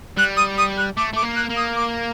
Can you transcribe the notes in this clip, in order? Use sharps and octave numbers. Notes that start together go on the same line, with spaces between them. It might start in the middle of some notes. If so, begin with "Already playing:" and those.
G3 F#6
D#6
D#6
F#6
A3 D6
A3 D6
A#3
F#6
A#3
D#6
D6